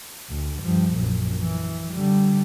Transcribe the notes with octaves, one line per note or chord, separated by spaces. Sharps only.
D2
G2 F3
A#1 F#2
E3
D3 G3